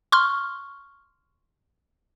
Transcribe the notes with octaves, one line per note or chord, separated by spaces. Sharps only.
C6 C#6 F6